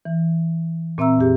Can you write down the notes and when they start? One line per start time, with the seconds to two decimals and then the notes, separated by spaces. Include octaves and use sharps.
0.05 E3
0.98 A#2 C4 E5 A#5 E6
1.18 F2 A#2 G4 G#4